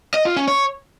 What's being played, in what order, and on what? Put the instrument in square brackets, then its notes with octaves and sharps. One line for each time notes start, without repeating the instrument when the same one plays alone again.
[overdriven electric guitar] D#5
F4
C#4
C#5